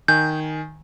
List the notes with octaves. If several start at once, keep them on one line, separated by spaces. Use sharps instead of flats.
D#3 G#5 G6